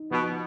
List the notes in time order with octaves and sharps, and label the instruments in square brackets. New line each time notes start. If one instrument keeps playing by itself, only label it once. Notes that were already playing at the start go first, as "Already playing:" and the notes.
Already playing: [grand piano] D#4
[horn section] B2 [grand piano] F3